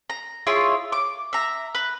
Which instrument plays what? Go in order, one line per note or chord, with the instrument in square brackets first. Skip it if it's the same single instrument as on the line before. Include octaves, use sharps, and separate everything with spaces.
[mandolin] A#5
E4 F4 G#4 C#5
D6
E5 A#5
B4